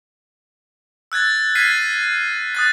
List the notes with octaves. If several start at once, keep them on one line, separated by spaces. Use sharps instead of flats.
E6 F#6 G#6 A6
F6 G#6 A6 B6 C7 D#7
D#6 F#6 A6